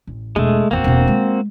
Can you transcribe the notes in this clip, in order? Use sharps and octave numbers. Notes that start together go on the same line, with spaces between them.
A1
E1 G#3 A3
A1 E2 A#3 C4 F#4
E1 D3
G#3